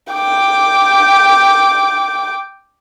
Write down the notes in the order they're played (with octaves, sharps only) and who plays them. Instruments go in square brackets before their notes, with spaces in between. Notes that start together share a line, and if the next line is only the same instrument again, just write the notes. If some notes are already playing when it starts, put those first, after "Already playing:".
[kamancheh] G5 D6